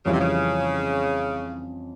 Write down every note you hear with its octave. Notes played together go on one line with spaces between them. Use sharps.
F2 C#3 E3 G3 C#4 F4
C3
C#3